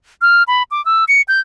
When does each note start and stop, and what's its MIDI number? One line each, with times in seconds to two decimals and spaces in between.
0.22 0.43 89
0.48 0.63 83
0.71 0.84 86
0.85 1.05 88
1.08 1.22 97
1.28 1.40 91